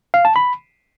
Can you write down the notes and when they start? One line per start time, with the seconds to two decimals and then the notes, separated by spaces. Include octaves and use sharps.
0.14 F5
0.25 A5
0.36 B5